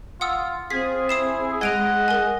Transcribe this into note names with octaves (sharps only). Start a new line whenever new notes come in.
F4 F#5 D#6 E6
C4 F4 G#4 B6
E4 D#6 C7 E7
G#3 D#5 F#5 G#6 D7 F7
A#4 G#5